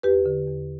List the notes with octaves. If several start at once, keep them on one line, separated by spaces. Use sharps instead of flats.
E2 G4 B4
D3
E2